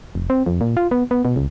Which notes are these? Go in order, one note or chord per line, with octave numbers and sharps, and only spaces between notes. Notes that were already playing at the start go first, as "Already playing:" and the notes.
F1
C4
F2
A#2
F4
B3
B3
B2
C#2